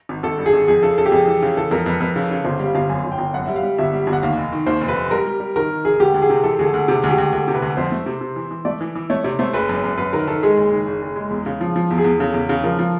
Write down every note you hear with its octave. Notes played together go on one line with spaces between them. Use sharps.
G#1
G#1 A4
G2
G#4
G#1
F2 G#4
C#3 A4
C#3 A4
G4
F2 G#4
E3
C#3
E3 A4
F2 A#4
F2 B4
F2 B4
C#3
C#3
G1 C5
G3 F5
G1 F5
F#2 G#5
G1
G5
G1
F#2 F#5
G3 E5
F5
G3
G1 E5
G3
G1
F#5
D#2 F5
F1
D#3
D#2 C5
F1
B4
F1
G3 A#4
G3
G3
D#3 A#4
D#3
F1 G#4
D2 G4
D2
G#4
C3
E3 A4
D2 G#4
A4
D2
C3 G#4
D2
G4
D2
D2 A4
C3
B4
D2
F2 C5
A3
C3
C3
E3
E3
A3 D5
E3
E3
A3 C#5
C3 C#5
A3 C5
F#1 B4
F#2
F#2
F#2 B4
D#3 A#4
D#3 A4
G#3 G#4
F#1
D#3
F#1
F#1
G#3
E2
C#3
F3
F3
E2
G#4
E2
C#3 A4
E2
C#3
F3 A#4
F3